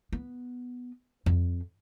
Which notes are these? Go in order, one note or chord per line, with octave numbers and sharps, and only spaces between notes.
B3
F2